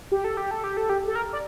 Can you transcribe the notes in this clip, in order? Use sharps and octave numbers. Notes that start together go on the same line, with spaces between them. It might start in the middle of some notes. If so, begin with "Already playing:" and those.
G4
A4
G4
A4
G4
A4
G4
A4
A#4
D5